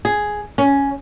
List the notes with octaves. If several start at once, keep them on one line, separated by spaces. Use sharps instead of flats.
G#4
C#4